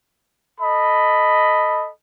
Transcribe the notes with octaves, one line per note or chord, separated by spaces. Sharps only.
A4 D#5 B5